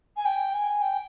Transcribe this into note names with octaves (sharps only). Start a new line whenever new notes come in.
G#5
G5
G#5
G5